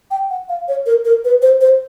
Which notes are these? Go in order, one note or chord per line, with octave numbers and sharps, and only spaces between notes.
G5
F#5
F5
C#5
A#4
A#4
B4
C5
C5